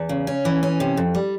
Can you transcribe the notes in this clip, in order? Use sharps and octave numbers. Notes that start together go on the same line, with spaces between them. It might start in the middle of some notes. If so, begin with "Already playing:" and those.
Already playing: E2
C#3
C#4
E3
C#4
C3
F2
G3